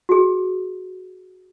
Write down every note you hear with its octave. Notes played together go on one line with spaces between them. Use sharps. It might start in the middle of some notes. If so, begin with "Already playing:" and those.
F#4 G#4